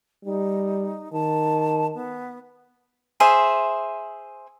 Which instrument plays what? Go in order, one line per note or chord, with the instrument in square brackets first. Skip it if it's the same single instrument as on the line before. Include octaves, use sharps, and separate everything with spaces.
[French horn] G3 [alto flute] D#4
[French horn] D#3 [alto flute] A5
[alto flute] B3
[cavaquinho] G#4 C5 E5